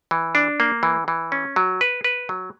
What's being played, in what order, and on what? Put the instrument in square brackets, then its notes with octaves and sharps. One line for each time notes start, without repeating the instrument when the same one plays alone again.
[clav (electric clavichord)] E3
D4
A#3
E3
E3
C#4
F#3
B4
B4
F#3